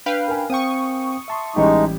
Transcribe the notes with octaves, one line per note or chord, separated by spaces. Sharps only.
D4 B4 F5 G5
A#4 G#5
C4 F5 G5 C#6 D#6
E5 A5 C6
A1 G3 G#3 D#4 G4